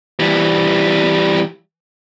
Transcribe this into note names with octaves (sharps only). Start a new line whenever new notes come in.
E3 G3